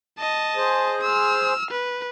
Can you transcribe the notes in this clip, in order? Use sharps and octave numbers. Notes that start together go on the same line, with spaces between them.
D#5 A5
G#4 C5
E6 F6
B4